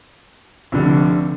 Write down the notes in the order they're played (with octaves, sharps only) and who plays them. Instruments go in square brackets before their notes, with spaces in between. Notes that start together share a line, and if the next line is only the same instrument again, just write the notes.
[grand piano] F1 F2 D3